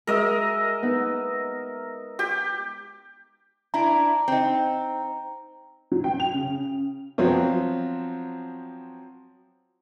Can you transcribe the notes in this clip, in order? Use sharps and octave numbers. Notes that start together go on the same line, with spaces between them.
G#3 F#4 G#4 A#4 D#5 E5
B3 D#4 B4
G4
D4 E4 A#5
C4 D#4
F#3
G5
F7
C#3
F3 F#3 B3 C4